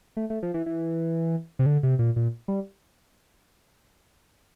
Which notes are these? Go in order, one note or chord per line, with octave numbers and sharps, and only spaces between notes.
A3
A3
F3
E3
E3
C3
D3
C3
A#2
A#2
G3